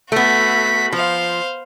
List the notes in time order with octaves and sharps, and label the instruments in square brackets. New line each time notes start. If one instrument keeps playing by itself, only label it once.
[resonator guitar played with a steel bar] A3 B3 [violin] F#4 B6
[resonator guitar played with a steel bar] F3 [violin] C5 F5